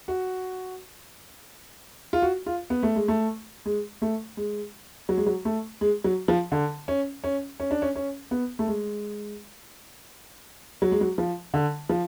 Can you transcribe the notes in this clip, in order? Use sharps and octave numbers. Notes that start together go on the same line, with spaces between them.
F#4
F4
F#4
F4
B3
A3
G#3
A3
G#3
A3
G#3
F#3
G#3
F#3
A3
G#3
F#3
F3
D3
C#4
C#4
C#4
D4
C#4
C#4
B3
A3
G#3
F#3
G#3
F#3
F3
D3
F3